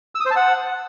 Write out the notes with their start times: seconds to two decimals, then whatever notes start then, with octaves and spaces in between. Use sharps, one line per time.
0.15 E6
0.20 D#6
0.26 C5
0.31 A5
0.36 F#5